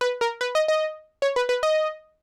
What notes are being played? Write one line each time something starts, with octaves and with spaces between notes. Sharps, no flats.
B4
A#4
B4
D#5
D#5
C#5
B4
B4
D#5